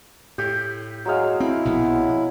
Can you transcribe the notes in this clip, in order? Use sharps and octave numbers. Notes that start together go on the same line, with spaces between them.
A2 G4
F#3 G#3 F5
C4 E4
A#1 B2 B3